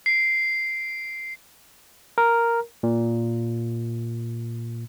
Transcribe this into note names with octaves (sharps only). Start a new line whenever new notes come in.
C7 D7
A#4
A#2